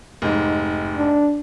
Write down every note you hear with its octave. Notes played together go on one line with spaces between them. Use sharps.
F1 G#2
D4